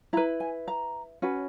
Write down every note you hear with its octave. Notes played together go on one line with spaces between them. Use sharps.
E4 B4 A#5
G#5
A#5
C#4 F#4 B4